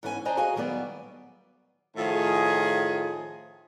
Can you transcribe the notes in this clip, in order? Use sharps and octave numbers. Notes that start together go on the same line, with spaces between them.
G#2 E3 B3 C#4 G4 G#5
D4 C5 D5 D#5 G#5 A#5
F#4 G#4 D#5 F5 G#5
D#3 F#3 G3 B3 D5
A2 D#3 F3 F4 G#4